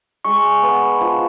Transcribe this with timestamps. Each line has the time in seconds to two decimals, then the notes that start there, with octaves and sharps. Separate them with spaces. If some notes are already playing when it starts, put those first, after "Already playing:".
0.25 G#3 C#6
0.62 B3
1.01 F3